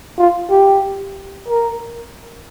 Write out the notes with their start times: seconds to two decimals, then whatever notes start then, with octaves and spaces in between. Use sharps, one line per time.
0.18 F4
0.50 G4
1.49 A#4